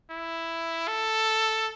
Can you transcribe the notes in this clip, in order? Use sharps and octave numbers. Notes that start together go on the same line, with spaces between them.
E4
A4